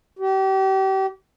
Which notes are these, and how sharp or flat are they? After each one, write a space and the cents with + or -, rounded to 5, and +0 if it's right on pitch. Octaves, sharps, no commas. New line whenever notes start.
G4 -35